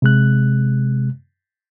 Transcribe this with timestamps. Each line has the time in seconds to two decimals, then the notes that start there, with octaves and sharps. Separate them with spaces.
0.02 C3 G#3 F#6